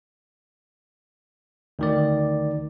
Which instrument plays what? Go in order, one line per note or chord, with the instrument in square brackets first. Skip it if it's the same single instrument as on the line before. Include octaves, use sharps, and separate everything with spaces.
[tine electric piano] D2 D#3 D5